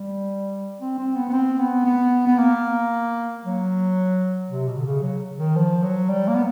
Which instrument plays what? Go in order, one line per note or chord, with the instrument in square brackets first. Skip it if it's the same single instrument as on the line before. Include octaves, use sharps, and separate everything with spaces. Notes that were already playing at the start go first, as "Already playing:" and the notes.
Already playing: [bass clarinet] G3
C4
C4
B3
B3
C4
B3
B3
B3
A#3
F#3
C3
B2
D3
C#3
F#3
D#3
F3
F#3
G3
A#3
B3